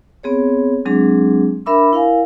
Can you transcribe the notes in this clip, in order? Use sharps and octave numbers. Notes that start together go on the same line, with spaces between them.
B3 C4 G#4 C#5
F#3 G#3 C4 D4 G#4
D4 A#4 E5 B5 D6 E6
E4 A#4 F5 G#5